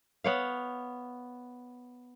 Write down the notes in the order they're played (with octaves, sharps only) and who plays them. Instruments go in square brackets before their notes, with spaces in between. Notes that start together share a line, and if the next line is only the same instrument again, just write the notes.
[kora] B3 C#5 F5